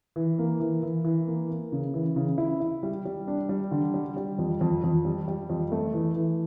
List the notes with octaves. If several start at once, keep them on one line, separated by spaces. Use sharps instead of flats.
E3
A#3
E3
E3
E3
A#3
A#3
C#3
E3
C#3
E4
E4
G3
G3
D4
G3
D3
G3
G3
F2
F2
F2
G3
G3
F2
A3
E3
E3